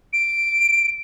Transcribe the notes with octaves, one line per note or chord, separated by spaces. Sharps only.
D7